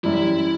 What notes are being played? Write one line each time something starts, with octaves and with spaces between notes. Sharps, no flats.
F#2 E3 G3 E4